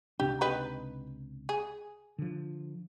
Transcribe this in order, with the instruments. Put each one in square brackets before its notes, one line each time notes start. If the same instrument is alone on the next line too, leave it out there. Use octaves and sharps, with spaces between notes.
[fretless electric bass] C#2 C3 D4 [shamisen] G4
[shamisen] D#4 G4 B4
G#4
[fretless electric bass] D3 F3